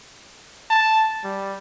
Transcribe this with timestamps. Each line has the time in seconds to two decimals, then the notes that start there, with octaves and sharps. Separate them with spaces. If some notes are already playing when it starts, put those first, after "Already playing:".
0.70 A5
1.24 G3